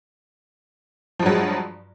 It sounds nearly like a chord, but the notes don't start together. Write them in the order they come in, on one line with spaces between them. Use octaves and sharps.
F3 G2 F#3 G#3